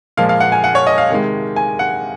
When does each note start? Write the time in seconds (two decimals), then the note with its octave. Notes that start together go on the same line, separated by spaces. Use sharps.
0.17 A#2 F3 G#3 F5
0.29 F5
0.40 F#5
0.52 G#5
0.64 F#5
0.75 C#5
0.87 D#5
0.98 F5
1.10 C3 D#3 G#3
1.56 G#5
1.79 F#5